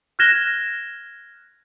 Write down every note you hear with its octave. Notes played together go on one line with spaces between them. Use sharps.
F6 F#6 G#6 A#6 E7 G7